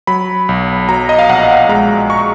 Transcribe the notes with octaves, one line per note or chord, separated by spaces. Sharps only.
F#3 B5
B1
F#3 A#5
D#5
F5
A#1 F#5
G#3 A#5
C#6